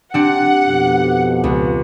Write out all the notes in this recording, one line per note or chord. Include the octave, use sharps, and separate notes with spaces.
C4 D4 G4 F#5 C#7
F2 B2
C#2